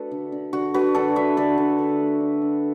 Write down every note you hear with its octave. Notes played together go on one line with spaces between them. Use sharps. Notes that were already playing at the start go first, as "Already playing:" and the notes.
Already playing: A3 D4 F#4 A4 B4
D3
D3
D3 F#4
D3 F#4 B4
D3 A4 D5
D4 B4 E5
D3 A4 D5
D3
D3
A3
D4
D4